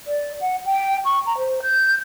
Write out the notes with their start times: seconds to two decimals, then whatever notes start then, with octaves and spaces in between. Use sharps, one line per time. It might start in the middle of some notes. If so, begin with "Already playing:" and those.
0.07 D5
0.41 F#5
0.66 G5
1.05 C#6
1.26 A#5
1.38 C5
1.62 G6